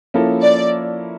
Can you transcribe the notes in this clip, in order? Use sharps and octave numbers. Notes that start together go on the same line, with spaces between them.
F3 A#3 C#4 E4 A4
D5